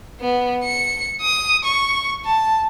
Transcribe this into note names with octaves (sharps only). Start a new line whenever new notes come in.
B3
C#7
D#6
C#6
A5